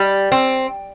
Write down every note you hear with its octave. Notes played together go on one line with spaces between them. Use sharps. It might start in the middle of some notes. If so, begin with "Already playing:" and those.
Already playing: G3
C4